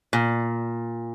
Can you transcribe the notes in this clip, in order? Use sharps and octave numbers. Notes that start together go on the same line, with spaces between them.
A#2